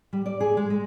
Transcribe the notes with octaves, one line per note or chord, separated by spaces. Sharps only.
G3
D5
G#4
G#3
G#3